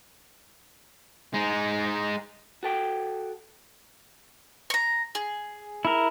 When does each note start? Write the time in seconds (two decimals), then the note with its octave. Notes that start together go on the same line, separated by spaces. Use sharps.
1.34 G#3 D#4
2.63 F#4 A4 G5
4.70 A#5 C#6
5.15 G#4
5.85 E4 A#4